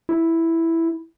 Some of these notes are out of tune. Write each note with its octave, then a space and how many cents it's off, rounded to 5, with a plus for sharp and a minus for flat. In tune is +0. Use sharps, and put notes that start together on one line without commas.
E4 +0